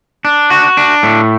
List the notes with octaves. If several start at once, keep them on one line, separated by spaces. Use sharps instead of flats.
D4
F#4
D4
A2